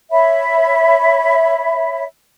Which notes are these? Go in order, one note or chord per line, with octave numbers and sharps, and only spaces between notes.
C#5 E5 B5